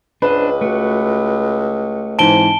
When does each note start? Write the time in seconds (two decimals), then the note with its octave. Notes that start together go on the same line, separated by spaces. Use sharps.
0.22 C#2 D4 B4 C5 D#5
0.61 A3 F#4
2.19 G#2 E3 C4 A5 D7 G7